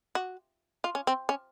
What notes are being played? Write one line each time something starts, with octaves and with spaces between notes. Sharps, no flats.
F#4
F4
C#4
C4
C#4